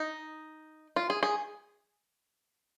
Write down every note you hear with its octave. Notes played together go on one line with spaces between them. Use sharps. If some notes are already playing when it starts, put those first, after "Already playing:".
Already playing: D#4
F4
G#4
G#4